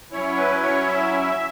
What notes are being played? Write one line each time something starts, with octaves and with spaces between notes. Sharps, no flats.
F#3 C#4 E4 C#5
B4
C#5
E5